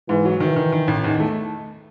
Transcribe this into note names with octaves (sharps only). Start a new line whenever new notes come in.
G#2 E3
F#3
D#3 E3
D#3
D#3
A1
E2 D#3
A3